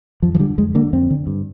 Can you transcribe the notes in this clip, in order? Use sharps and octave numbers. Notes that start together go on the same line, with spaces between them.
F2 F3
F3
D3 G3
F2 G#3
D3 A#3
F2 C4
D3
G2